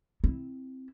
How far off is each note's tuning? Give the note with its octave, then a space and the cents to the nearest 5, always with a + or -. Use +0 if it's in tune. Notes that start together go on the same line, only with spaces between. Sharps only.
C4 +0 E4 +0